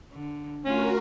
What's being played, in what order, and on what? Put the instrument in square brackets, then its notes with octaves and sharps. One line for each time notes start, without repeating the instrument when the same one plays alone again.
[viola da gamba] D3
[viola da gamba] A3 F4 [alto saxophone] C#4 [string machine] F#4 A#4